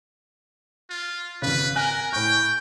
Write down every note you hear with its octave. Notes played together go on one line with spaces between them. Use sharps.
F4
G#1 C#3 B4
A#4 G#5 F#6
A2 G5 C#6